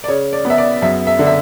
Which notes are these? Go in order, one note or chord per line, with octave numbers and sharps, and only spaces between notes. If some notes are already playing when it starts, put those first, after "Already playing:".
D5
C#3 C#5
D5
B3
E5
D5
F#2 E5
E5
D3
E5